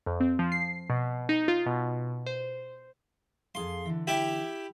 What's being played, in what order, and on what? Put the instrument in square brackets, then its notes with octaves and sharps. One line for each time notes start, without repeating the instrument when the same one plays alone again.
[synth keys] F2
C4
F3
C7
B2
D#4
F4
B2
C5
[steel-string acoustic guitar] F2 G#4 F5 [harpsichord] C6
[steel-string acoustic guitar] D3 E3
[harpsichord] E4 G4 E5